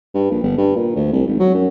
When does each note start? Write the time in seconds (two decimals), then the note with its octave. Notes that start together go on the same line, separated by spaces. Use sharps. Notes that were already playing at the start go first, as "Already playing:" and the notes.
0.14 G2
0.31 A#1
0.43 G1
0.58 G2
0.77 A#2
0.96 D2
1.13 C2
1.27 G#1
1.40 F#3
1.55 F#2